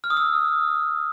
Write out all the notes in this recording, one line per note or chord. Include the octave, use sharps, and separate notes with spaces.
F6
D#6
E6